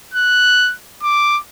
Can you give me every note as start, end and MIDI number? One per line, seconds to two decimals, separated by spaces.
0.14 0.74 90
1.03 1.39 86